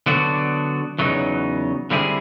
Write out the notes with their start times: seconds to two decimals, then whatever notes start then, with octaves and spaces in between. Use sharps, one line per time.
0.06 D3 F#3 B3 D4 F#4
0.99 E2 C#3 F#3 B3 D#4
1.90 D3 G3 C4 E4 G#4